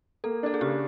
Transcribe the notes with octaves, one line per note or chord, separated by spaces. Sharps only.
A#3 A4
D4 A4
G#4
C#3 G4